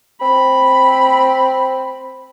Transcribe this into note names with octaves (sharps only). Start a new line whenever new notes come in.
C4 B5